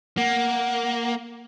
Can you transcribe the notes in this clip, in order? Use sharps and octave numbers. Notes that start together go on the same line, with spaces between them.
A#3 F#5